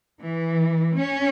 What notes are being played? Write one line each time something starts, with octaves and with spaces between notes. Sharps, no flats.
E3
C#4